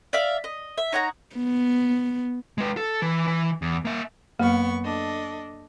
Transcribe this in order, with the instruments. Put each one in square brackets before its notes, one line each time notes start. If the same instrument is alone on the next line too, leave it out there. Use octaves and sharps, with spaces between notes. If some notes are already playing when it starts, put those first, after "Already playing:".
[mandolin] D5 E5 F5
D#5
E5
D#4 C#5 F#5 A#5
[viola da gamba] B3
[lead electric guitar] G#3 B4
A4
E3
E3
E2
A#3 E5
[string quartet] F#2 B3 C#6 [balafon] A#3
[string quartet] D4 A4 D#5